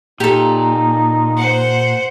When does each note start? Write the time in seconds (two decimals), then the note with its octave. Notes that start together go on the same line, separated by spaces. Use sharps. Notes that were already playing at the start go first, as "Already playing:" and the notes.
0.20 A#2 D#4 G4 A4
1.37 C5 F#5